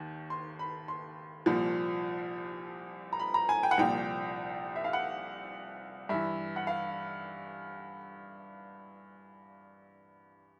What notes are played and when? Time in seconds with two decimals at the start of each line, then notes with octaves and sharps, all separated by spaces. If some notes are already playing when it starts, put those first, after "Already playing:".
Already playing: D#2 D#3
0.30 C6
0.59 B5
0.88 C6
1.46 C2 A#2 F3
3.13 A#5
3.19 B5
3.34 A#5
3.49 G#5
3.63 G5
3.71 F#5
3.77 C2 A#2 F3 G5
4.76 E5
4.84 F5
4.93 F#5
6.09 G2 E3 E5
6.56 F#5
6.67 F5